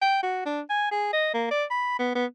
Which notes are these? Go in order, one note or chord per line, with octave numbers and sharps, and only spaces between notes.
G5
F#4
D4
G#5
G#4
D#5
A#3
D5
B5
B3
B3